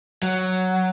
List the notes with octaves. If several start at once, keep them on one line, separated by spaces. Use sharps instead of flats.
F#3